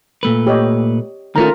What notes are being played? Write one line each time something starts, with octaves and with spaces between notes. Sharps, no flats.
A#2 A3 B4
G4 C#5 D#5
D#3 A3 C#4 F4 A#4 A#5